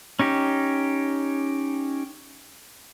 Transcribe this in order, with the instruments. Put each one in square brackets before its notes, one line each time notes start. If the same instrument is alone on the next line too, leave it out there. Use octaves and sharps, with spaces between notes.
[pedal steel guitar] C#4 D#4 G4